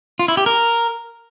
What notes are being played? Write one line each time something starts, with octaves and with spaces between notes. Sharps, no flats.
F4
E4
G4
A#4